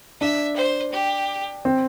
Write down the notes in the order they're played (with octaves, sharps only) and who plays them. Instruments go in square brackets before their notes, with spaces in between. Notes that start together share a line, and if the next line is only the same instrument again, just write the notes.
[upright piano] D4 [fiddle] E5
[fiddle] C5
G4
[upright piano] C4